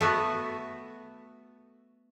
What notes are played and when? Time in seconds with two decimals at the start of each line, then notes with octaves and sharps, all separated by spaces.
0.01 A3 B3 F#4